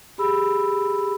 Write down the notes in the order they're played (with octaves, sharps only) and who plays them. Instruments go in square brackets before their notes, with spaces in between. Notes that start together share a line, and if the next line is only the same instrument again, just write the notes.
[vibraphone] G4 G#4 B5 E6